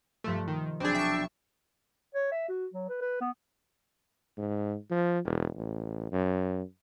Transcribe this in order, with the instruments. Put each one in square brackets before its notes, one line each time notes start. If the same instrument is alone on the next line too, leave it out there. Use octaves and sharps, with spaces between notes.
[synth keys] G2 A3 [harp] C3 F3
[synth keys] D#3
[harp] B1 [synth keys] C4 G#4 [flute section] D4 G5
[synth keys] E5 C#6
[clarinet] C#5
E5
F#4
F#3
B4
B4
B3
[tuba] G#2
F3
E1
A1
F#2